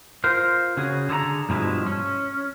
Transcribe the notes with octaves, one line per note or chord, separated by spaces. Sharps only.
F4 A#4 C5
C#3 C#4 F#4 G#4
D3 G#4 A4 D5 A#5
G2 B2 F3 G#3 E4
C#4